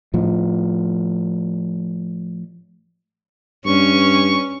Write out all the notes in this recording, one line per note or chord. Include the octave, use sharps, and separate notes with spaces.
A2 F3
G2 C#4 C#6